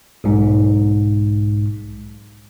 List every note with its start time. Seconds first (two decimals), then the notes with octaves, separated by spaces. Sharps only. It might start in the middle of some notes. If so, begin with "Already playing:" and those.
0.24 B1 G#2